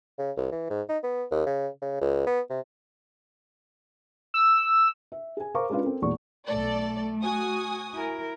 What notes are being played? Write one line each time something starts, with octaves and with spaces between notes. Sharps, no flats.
C#3
C2
E3
G#2
D#4
B3
D#2
C#3
C#3
C#2
B3
C3
E6
E5
G#4 G#5
A#4 C5 F5 A#5 C#6 D6
G#3 C#4 D4 F4 B4 F5
C4 A4 A#4
E1 E2 A#2 C#6
B1 A3 A4 D5
F#4 G#5 D#6
E4 A#4